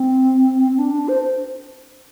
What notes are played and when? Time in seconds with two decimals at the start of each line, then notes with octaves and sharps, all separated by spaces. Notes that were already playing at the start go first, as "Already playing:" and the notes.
Already playing: C4
0.72 C4
0.79 D4
0.94 D4
1.08 C5